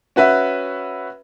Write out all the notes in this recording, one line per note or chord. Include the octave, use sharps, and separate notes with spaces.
C#4 F#4 B4 E5